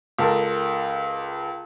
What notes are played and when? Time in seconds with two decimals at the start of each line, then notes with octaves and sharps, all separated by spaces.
0.19 C#2 A4 A#4